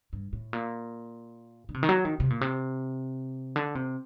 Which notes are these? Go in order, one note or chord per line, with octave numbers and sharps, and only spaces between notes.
G2
A2
A#2
D3
C3
D#3
F#3
D#3
C3
A#2
C3
D3
C3